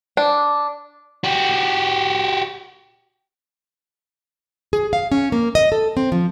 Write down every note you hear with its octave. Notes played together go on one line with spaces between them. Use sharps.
D4
F#4 G4
G#4
F5
C#4
A#3
D#5
A4
C4
F3